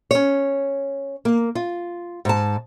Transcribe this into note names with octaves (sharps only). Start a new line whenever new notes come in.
C#4 C#5
A#3
F4
G#2 A5